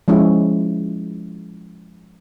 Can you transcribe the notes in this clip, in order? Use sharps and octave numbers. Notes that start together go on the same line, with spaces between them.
F3 G#3 C#4 E4